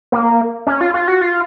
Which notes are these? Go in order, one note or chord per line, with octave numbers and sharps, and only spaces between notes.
A#3
C#4
F4
F4
F#4
F4